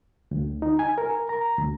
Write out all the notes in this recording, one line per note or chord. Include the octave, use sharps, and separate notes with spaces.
D2
D#4
G#5
A#4
A#5
D2